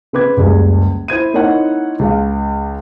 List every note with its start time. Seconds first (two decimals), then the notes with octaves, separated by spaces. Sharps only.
0.13 C#3 C4 B4 D6 G#6
0.37 F#1 C#2 G3 G#4
1.08 E4 C5 G#6 D#7
1.34 A#3 C4 D#4 E4 C#5 F#5
1.99 C#2 G#4 F5